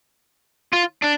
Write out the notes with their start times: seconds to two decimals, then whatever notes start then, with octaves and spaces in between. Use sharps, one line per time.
0.73 F4
1.02 D4